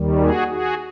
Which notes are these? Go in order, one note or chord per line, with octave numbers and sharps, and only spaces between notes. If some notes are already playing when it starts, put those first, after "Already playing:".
Already playing: D#2 D#3 G3
F#4 G#4
F#4 G#4